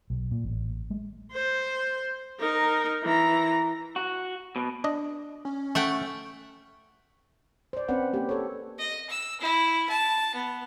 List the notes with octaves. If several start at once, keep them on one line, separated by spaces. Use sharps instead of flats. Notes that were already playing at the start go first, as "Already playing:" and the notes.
B1
A#2
A1
G#3 A3
C5
D#4 A#4
E3 A#5
F#4
B2
D4 D#5
C#4
A3 F#5 G5 C#6
C5 D5
C4 C#4 B4 D5 F#5
A#3 G4
A4 C#5
D#5
E6
E4
A5
B3